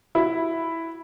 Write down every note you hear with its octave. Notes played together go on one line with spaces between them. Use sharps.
E4 F#4